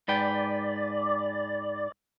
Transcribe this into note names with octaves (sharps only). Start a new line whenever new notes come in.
G#2 B4 D5 G5